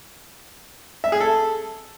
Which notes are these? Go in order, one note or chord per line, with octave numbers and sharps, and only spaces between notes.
E5
G#4
A4